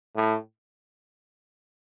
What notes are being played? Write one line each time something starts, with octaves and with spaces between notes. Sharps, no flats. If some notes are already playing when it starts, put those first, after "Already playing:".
A2